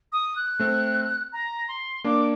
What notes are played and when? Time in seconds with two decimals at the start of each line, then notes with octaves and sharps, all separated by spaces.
0.12 D#6
0.36 F#6
0.59 A3 C4
1.33 A#5
1.68 C6
2.04 A#3 D4 D6